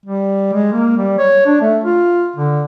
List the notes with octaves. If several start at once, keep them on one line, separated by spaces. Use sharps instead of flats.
G3
G#3
A#3
G3
C#5
D4
A3
F4
D3